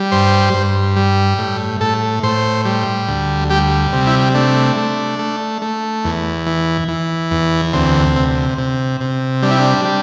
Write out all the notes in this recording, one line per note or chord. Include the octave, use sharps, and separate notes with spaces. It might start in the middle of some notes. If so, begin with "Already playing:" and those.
Already playing: G3
G2 C5
G2
G3
A2
A2 A4
A2 C5
G3
D2
G3 G4
C3
E4
A3 D4
A3
A3
A3
E2
E3
E3
E2
D2 C4
C3
C3
C3
G3 D4
E4
D4
G3